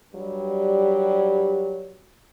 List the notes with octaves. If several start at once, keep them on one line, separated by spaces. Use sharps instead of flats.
G2 F#3 G3